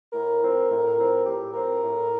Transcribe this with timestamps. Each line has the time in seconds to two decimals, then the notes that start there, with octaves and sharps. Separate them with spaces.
0.12 A2 A#4
0.40 F3 C4
0.69 A2
0.97 F3 C4
1.25 A2 G4
1.54 F3 C4 A#4
1.82 A2